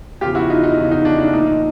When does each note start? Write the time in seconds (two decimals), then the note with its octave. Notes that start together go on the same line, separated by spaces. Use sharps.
0.21 E2 C#3 F3 F4 G4
0.35 E4 F#4
0.50 D#4 F4
0.63 D#4
0.77 E2 C#3 F3
0.91 D#4
1.05 D4
1.19 D4
1.33 A#2 F3 D#4